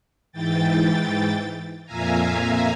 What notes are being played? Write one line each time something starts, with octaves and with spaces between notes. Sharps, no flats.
G#2 E3 G5 A6
F2 A#2 E5 F5 G#5 A#5